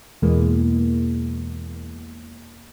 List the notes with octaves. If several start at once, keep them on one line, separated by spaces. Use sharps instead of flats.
E2 B2 E3 G#3 A#3